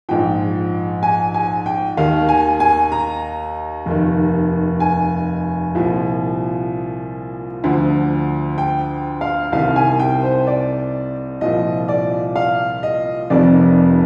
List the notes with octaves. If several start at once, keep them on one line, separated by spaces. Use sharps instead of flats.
A#1 G#2 F3 G5
G#5
G#5
G5
D#2 D#3 F5
G#5
G#5
A#5
F1 D#2 D#3
G#5
C2 A#2 F3
D2 D3 F3
G5
F5
C2 C3 D#3 F5
G#5
G5
C5
D5
C2 A#2 F3 D#5
D5
F5
D#5
F1 F2 C3 D#3 D5